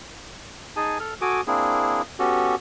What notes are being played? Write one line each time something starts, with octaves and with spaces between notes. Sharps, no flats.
D#4 G#4 G#5 A5
A4 F6
F#4 A4 G#5 D6 D#6
A#3 C4 D4 E4 G#4
B3 C#4 F#4 G4 A4